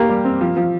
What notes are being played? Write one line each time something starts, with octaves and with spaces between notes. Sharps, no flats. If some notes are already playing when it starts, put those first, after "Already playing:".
Already playing: A#3 G4
G3
C4
F3
F3